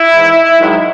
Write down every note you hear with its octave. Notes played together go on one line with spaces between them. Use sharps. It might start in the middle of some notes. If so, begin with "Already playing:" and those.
Already playing: E4
G#2 E3
G#2 D#3 F#3